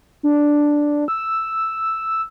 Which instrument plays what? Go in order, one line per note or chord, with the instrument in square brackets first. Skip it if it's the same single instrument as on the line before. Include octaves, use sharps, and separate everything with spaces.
[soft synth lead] D4
E6